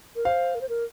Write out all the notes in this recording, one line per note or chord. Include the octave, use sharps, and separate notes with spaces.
A#4
C5 F5
A#4
C5
A#4